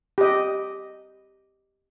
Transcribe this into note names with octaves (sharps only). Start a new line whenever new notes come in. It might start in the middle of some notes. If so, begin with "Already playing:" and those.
G4 D#5